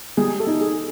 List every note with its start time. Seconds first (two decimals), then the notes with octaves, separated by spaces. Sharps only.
0.17 G3 G#4
0.40 A4
0.47 D#4
0.61 G#4